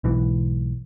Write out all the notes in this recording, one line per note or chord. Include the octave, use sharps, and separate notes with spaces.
B1 G#2 E3